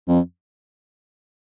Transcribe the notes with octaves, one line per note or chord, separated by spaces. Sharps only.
F2